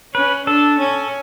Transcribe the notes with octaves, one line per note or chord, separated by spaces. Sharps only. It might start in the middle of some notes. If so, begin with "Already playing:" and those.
C#4 B4
D4 A4
C#4